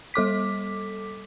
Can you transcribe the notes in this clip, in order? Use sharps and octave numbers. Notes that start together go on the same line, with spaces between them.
G3 A4 D6 B6